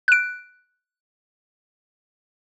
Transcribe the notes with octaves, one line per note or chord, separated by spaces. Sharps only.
F#6 D7